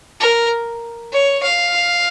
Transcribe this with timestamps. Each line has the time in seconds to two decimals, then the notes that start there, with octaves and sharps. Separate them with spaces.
0.21 A#4
1.13 C#5
1.43 F5